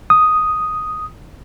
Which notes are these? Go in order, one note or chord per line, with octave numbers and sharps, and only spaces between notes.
D#6